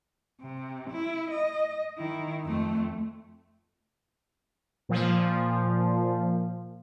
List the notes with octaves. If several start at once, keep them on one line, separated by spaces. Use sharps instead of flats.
C3
E4
D#5
D#3 E4
F2 A3
A#2 F3